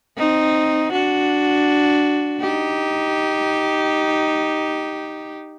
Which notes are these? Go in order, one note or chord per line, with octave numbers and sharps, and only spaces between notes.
C4 D#4
D4 F#4
D#4 G4